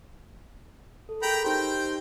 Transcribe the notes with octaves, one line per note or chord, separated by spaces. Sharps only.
A4
G#4 A#4 G5 A#5 B5
D#4 G4 C5 G5